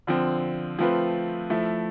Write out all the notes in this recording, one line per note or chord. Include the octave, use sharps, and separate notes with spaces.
D3 F3 C4
F3 A3 C4 F4 B4
F3 A3 E4